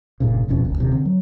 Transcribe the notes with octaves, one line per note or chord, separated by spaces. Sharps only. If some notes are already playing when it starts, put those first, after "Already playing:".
F1 G2 A#2 C#3
D#1 F2 B2 C#4
F#1 D2
D#1 C3 D#3
D3 C4
F#3